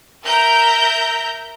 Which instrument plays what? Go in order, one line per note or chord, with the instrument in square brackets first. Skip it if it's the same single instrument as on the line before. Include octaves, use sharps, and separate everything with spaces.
[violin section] A#4 E5 A#5 G6